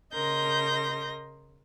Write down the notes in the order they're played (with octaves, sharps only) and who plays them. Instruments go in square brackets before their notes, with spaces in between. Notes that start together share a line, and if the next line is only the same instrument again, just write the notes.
[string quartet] C#3 A#4 D#5 C6 G6 A#6